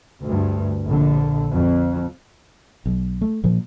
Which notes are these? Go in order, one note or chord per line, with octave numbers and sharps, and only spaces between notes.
D2 G2
A#1 D3
F2
B1
A3
A#2 F3